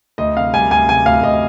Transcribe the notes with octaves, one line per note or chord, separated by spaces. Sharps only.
D2 D#5
C3 F5
G3 G#5
D2 G#5
C3 G#5
D2 F5
D2 D#5